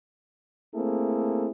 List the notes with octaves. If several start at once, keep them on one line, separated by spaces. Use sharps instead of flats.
A3 A#3 C4 E4 G#4 A4